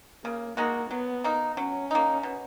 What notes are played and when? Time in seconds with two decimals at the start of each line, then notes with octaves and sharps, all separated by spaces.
0.24 C#3 A#3
0.57 G#3 A#3 D#4 F#4
0.90 F#3 B3
1.24 A#3 D#4
1.57 F#3 C#4
1.91 A#3 D#4
2.23 B2